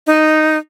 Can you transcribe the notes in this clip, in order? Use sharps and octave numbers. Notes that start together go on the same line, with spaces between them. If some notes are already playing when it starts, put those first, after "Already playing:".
D#4